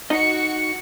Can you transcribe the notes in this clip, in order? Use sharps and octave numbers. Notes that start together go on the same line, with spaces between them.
D#4 F#4 D#5 C#7